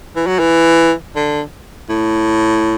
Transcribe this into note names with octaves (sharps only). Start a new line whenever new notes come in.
E3
F#3
E3
D3
A2